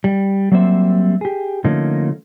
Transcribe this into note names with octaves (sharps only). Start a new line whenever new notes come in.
G3
F#3 G3 A#3 C4 C5 E5
G4 G#4
D3 F3 A3 A#3 C#4 D#4